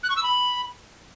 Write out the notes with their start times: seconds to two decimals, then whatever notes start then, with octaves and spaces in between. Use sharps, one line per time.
0.03 F#6
0.10 C#6
0.16 E6
0.23 B5